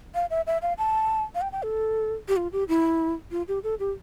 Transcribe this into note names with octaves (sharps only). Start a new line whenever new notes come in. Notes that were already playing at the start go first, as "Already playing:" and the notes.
F5
E5
E5
F5
A5
F5
G5
G5
A4
G4
F4
G4
E4
F4
G4
A4
G4